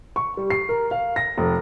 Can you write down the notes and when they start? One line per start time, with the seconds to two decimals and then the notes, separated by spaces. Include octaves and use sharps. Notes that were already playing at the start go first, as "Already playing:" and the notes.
0.16 C#6
0.37 G3
0.50 C7
0.69 A#4
0.91 F5
1.16 A#6
1.38 F1